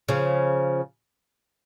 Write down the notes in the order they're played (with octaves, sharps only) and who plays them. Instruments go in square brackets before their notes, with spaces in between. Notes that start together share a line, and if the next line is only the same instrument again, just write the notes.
[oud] C#3 F3